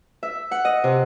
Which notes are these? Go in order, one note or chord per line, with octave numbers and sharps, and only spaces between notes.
E5
F#5
D#5
C3